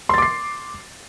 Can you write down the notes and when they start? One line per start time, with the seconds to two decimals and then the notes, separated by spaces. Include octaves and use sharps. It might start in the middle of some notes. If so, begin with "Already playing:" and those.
0.09 C6
0.14 A6
0.18 D6
0.22 C7